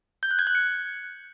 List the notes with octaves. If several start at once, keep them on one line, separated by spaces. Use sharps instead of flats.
G6
F#6
G#6
F#6
C#7